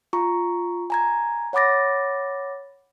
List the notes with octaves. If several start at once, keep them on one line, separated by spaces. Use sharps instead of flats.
F4 A#5 C#6
G#5 A#5 G#6
C#5 F#5 B5 D6 A6 A#6